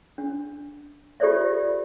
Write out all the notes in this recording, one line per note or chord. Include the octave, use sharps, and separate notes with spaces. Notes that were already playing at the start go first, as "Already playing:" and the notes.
D4
F4 G4 A4 C5 D5 E5